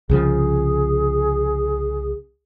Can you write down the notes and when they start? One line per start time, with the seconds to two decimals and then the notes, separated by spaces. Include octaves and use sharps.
0.10 C2 C#3 F3 G#4